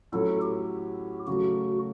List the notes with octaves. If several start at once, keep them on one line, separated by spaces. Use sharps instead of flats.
A2 F#3 C#4 F#4 A4
G4
C#3 F#3 A3 F#4